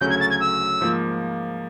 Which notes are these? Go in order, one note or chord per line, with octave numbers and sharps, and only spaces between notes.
D2 C#3 F#3 A3 C#4 G6
G#6
A6
G#6
E6
G#2 F3 A#3